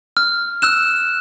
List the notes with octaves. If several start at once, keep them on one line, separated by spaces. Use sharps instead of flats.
F6
E6 F#6 E7